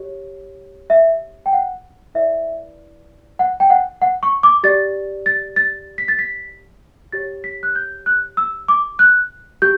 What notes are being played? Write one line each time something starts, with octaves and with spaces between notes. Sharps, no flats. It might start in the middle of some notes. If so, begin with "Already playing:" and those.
Already playing: G4 C#5
E5
G5
F#5
E4 B4 D5 E5
F#5
G5
F#5
F#5
C#6
D6
G4 D5 A6
A6
A6
B6
A6
B6
G4 C#5 A6
B6
F#6
G6
F#6
E6
D6
F#6
G4 G6